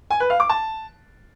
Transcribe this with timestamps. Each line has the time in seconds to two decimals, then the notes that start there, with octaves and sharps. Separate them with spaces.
0.11 G#5
0.20 B4
0.30 F5
0.40 D6
0.49 A5